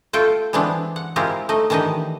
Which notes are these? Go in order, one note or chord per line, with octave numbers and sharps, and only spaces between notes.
A3 F4 A4 G5
E3 G#3 B3 C4 D4
F#5
G#3 C4 E4 F4 G4 A#4
A3 D#4 D#5
D#3 E3 D4 G4 D#5